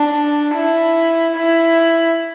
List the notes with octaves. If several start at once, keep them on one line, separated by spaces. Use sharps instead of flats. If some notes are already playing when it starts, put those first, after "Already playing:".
Already playing: D4
E4
E4